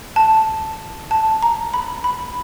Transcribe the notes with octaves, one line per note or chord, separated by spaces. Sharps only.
A5
A5
A#5
B5
B5